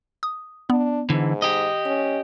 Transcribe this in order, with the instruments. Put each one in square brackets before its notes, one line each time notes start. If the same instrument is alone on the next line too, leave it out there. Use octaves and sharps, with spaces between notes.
[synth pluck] D#6
[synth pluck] B3 [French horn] D4
[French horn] G#2 [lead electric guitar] D3 E3
[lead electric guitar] G4 D#5
[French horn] C#4